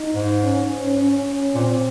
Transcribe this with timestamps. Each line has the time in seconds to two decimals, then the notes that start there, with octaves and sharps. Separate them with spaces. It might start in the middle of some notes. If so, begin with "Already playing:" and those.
Already playing: D#4
0.15 G#2
0.43 C#4
0.98 C#4
1.54 A#2 C4